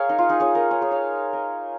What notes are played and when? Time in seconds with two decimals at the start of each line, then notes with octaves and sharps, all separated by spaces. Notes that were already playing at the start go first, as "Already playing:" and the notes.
Already playing: G#4 A#4 C#5 F5
0.09 D#4
0.18 F4
0.29 D#4 G#4
0.40 G#4 C#5
0.55 A#4 D#5
0.70 G#4 C#5
0.81 G#4 C#5
0.91 C#5 F5
1.33 A#4 D#5